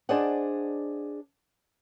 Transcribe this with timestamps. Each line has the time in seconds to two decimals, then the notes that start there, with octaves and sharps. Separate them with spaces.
0.09 D4 G#4 C5 D5 D#5 F#5